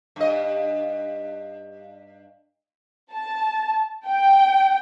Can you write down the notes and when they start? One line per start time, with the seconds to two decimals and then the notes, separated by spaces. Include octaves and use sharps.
0.16 G2 D#5
3.12 A5
4.06 G5